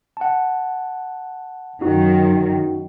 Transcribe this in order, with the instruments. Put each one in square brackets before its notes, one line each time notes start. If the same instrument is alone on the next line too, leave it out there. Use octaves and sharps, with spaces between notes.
[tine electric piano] F#5 A5
[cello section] F#2 D#3 [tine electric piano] D#4 F#4